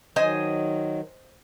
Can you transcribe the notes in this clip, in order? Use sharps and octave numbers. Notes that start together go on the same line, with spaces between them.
D#3 F#3 C5 D#5 G#5